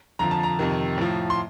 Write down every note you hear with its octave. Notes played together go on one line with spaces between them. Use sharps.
F2 D3 F3 A#5
A5
A#5
F2 C3 D#3
A2 F3
C6